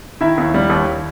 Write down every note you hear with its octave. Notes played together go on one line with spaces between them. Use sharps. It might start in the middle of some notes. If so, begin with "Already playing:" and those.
D#3 E4 E5
D#2
G3
D#2